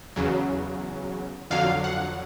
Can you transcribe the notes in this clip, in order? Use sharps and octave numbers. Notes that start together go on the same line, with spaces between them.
E2 C#3 F#3
F2 D3 F#3 F5
F#5